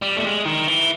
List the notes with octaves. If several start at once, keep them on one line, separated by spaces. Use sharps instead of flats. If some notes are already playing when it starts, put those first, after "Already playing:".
G3
A3
G#3
D#3
E3